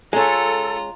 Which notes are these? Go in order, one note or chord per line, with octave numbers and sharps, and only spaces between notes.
G#3 C#4 F4 A4 A#5